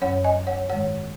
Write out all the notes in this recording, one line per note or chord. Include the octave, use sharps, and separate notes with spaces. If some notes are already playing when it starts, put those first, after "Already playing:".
F#2 F#3 C#4 C#5 F#5
D#5 G#5
C#5 F#5
G#2 D#3 G#3 C#5 F#5